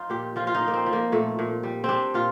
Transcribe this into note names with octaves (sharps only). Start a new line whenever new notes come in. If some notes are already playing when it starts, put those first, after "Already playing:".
Already playing: F3 D#4 F4
A#2 G4
F3 F4
F4
D#4
F3
A#3
C4
F3
A#3
A#2 A3
A#2
G3
G3 C4 D4
A#2 F4